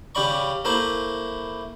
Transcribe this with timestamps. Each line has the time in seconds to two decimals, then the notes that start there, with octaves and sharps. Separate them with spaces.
0.15 C#3 C#4 G4 D5 B5 C#6
0.65 A3 A#3 E4 C5 B5